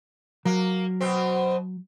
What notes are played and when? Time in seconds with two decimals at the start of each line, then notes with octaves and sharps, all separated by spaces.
0.45 F#3 A#3
1.00 B2 C4